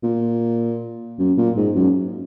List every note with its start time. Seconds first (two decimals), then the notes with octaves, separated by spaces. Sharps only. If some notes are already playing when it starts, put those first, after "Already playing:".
0.03 A#2
1.19 F#2
1.37 A#2
1.57 G#2
1.75 F#2